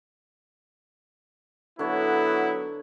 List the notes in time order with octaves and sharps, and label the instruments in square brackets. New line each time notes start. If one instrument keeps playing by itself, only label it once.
[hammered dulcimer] D3 C#5 [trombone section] F#3 B3 [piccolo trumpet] E4